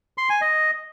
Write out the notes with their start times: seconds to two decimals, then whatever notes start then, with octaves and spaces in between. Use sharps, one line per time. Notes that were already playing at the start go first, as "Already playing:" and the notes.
0.18 C6
0.29 G#5
0.41 D#5